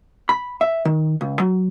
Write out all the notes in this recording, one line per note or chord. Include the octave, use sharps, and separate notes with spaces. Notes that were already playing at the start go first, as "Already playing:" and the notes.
B5
E5
D#3
C#2
F#3